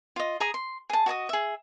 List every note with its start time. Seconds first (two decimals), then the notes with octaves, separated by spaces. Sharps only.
0.16 F4 D#5
0.40 G#4 G#5 A#5 D#6
0.54 C6
0.90 G#4 A5
1.06 F#4 D#5 A5 D#6
1.29 G#4 E5